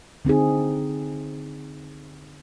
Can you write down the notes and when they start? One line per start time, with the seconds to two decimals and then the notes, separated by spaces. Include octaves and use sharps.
0.25 D3 C4 D#4 G#4